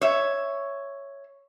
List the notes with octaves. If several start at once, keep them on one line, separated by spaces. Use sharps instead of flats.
C#5 E5